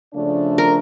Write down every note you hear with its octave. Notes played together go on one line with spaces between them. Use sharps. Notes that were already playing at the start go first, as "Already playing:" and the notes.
C#3 F3 A3 D4
A#4